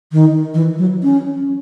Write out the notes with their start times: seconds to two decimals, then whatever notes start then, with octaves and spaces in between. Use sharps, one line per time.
0.12 D#3
0.54 E3
0.78 F#3
1.03 C#4